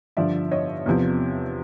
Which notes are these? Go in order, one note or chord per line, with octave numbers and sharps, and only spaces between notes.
G2 D3 F3 D5 E5
C#5 D#5
E2 C3 F3